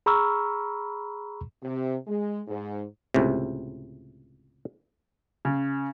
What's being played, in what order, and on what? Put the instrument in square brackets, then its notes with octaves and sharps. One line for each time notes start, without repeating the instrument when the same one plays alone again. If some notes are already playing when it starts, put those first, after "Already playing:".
[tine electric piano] G#4 A#5 B5 C#6 E6 F6
[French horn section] C3
G#3
G#2
[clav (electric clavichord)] C#2 A2 C3
[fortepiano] C#3